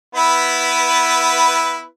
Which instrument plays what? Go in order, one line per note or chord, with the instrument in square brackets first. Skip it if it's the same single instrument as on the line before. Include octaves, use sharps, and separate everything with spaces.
[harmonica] B3 E4 B4